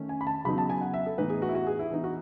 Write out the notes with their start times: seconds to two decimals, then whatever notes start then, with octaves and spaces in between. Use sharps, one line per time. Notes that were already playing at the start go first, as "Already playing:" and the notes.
Already playing: D#3 A3 C#4
0.09 G#5
0.21 B5
0.27 A5
0.45 C#3 F#3 B3 D#4 B5
0.58 A5
0.70 G#5
0.81 F#5
0.94 E5
1.06 A4
1.18 A2 E3 B3 D#4 B4
1.30 G#4
1.42 F#4
1.49 E4
1.55 F#4
1.67 G#4
1.79 E4
1.91 E3 B3 D#4
2.04 F#4